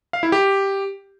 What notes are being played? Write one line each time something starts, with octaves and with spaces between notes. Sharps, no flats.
F5
E4
G4